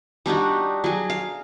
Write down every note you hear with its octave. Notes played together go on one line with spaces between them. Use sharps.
G3 D4 D#4 F#4
F#3 G#4
F5